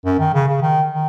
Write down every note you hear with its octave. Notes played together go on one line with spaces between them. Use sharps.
F#2
D#3
C#3
C#3
D#3
D#3